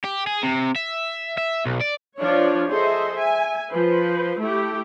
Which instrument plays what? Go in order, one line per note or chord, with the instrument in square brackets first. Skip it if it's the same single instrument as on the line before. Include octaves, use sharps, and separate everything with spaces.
[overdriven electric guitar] G4
G#4
C3
E5
E5
B1
D5
[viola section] F3 D4 F4 C#5
G#4 A4 C5 D#5 E5
E5 G#5
F3 B4 C5
A3 E4 G4